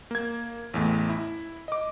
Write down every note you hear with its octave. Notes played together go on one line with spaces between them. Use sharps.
A#3 G#6
A1 E2 A3
E4
D#5 D6